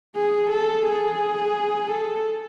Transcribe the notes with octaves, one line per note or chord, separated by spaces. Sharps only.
G#4
A4
G#4
A4